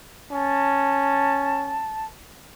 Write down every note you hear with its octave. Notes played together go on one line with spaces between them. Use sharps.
C#4 A5